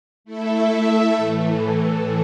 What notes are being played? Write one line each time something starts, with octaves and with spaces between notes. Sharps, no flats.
A3 E4 A4 E5
A2 E3 A3